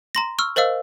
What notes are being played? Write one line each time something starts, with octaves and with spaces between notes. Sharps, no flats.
A#5 C6 A#6
C#6 E6 F6
A#4 C5 D#5 F5 E6